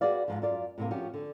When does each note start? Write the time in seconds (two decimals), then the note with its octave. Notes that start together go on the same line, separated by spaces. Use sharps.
0.01 F#4 G#4 B4 D5 F5
0.28 G#2 F3
0.42 F#2 F4 D5 F5
0.78 A2 C3 A#3
0.91 F3 C#4 F#4 G4
1.14 D3